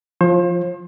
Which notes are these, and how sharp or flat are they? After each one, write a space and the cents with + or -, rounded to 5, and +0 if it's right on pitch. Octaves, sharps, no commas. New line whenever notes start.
F3 +0 C5 +35